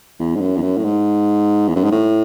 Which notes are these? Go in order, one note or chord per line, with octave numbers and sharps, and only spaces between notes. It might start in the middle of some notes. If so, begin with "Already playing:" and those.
E2
G#2
F#2
E2
F#2
A2
G#2
E2
F#2
G#2
A2